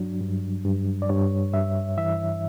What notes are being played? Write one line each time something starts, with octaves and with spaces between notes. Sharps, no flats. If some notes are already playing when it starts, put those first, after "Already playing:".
Already playing: G2 F#3 D4
G2
G2
D5
G2 C#5
G2 E5
E3 E5